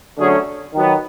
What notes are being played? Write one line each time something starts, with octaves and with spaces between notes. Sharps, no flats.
D3 F#3 A3 C#4 G#4
D#3 F#3 B3